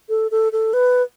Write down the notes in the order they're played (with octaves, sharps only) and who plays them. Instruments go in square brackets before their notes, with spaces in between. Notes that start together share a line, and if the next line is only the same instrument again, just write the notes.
[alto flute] A4
A4
A4
B4